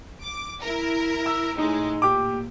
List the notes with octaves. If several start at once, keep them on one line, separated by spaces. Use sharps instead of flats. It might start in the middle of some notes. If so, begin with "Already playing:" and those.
D6
E4 A#4
E6
A2 G#3 D#4
A#2 G4 D6